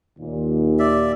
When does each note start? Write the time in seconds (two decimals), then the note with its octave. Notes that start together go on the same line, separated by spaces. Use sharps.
0.19 D#2 A#2
0.79 D5 E5